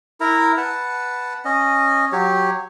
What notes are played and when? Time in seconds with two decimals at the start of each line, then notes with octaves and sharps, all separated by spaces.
0.20 E4 A#4 A#5
0.57 B4 F#5 A5
1.45 C#4 D#5
2.12 F#3 G4 C#5